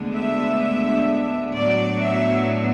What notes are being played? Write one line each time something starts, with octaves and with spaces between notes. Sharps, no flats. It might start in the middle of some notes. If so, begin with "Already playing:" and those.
Already playing: D2 D3 G#3 B3 D4
E5
A2 F#3 B3 D4 D5
E5